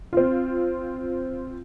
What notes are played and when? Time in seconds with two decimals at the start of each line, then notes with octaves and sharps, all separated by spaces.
0.13 C4 F4